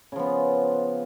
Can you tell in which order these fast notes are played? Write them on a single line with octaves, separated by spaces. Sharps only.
C#3 F3 B3